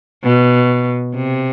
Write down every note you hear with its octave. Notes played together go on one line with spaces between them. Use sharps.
B2
C3